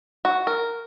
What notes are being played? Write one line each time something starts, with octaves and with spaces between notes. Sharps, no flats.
F#4
A#4